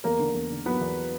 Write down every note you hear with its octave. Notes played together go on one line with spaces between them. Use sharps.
E2 A#3 A#4
D3
E2
D3
F#3 B3 B4
E2